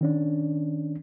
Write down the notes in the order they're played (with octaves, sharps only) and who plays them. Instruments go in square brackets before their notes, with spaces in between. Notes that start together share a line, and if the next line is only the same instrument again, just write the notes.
[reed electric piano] D#3 C#4 D4